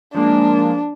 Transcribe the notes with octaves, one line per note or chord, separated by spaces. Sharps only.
F3 G#3 A#3 D4